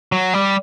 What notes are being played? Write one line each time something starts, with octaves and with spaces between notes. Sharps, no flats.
F#3
G3